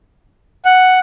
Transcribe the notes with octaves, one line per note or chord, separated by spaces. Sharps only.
F#5